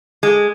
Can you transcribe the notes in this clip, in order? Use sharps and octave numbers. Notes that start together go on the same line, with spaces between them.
G#3